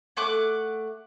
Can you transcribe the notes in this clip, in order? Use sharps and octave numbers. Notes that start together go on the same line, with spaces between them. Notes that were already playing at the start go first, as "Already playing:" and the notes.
A3 F#5 D6 F#6